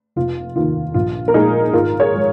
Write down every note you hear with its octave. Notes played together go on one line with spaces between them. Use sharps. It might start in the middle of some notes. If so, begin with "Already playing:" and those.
F1 F4
D#2 D#3 F4
A#1 F4
A#4
A#2 G#3 D#4 G#4
G#1 F4 A#4
G#4 C#5
F3 G#3